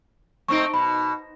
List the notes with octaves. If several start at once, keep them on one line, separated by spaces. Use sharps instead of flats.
A3 C4 D#4 C#6 D7
B2 B5